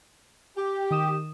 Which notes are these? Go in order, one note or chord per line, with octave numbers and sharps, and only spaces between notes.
G4
D#3 D#6 E7